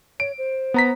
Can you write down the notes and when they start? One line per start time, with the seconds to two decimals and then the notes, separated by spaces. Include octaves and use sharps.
0.20 C#5 D7
0.38 C5
0.74 B3 A#5 B6